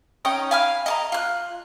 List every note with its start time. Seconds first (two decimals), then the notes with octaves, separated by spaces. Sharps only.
0.25 C#4 D#4 G5 D#6
0.51 F5 G#5 B5 F6
0.86 D#5 A5 A#5
1.12 F4 F#6